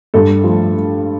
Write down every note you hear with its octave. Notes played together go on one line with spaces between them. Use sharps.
G2 A4
F3 A3